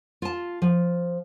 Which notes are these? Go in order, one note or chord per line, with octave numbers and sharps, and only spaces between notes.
F4 A5
F3